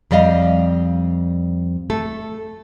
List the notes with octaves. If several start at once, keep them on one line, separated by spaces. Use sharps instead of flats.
F2 G3 D5 D#5 F5
A3 A4